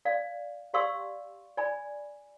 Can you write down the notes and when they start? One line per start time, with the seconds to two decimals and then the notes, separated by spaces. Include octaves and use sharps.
0.05 D5 F5
0.74 G4 D5 F5 C6 C#6 E6
1.57 D5 G#5 B5